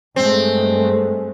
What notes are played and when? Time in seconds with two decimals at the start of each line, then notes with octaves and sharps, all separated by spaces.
0.16 G2 G#3 A3 C4